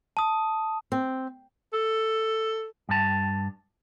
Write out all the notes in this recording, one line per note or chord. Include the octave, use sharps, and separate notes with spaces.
A5 D#6
C4
A4
G2 A5